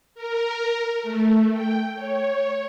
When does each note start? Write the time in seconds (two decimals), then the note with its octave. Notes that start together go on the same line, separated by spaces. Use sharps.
0.15 A#4
1.03 A3
1.52 G5
1.95 C#5